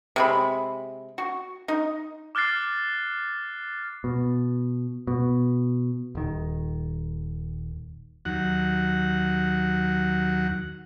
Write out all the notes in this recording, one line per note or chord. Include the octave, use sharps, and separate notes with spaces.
C3 G#3 B5
F#4
D#4
D6 F6 F#6 A6 C7
B2
B2
D#1 D#3
D#2 F#3 F#5